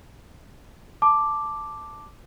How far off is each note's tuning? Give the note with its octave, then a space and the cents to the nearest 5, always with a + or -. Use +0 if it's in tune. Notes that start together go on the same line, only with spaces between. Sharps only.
A5 +0 D6 +0